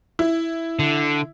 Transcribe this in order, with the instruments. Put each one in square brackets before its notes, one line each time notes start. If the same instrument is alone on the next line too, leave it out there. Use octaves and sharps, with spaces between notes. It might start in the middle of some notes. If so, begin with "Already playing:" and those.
[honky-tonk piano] E4
[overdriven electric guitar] D3